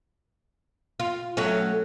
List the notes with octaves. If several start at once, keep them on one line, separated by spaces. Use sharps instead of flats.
F4
F#3 A3 C#4